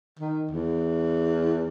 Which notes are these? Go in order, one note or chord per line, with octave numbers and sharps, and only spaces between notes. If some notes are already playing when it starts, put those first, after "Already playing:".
D#3
E2